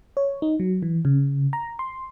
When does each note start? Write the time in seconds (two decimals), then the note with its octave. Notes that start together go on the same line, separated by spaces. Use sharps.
0.17 C#5
0.42 D#4
0.60 F#3
0.83 E3
1.05 C#3
1.53 A#5
1.79 C6